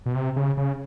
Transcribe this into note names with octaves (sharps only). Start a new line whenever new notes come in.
B2
C3
C#3
C#3